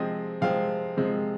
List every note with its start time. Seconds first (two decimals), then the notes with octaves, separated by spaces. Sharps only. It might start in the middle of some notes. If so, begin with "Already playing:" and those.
Already playing: C3 F3 G#3 C4 D#5
0.41 C3 F3 G#3 C4 F5
0.97 C3 F3 G#3 C4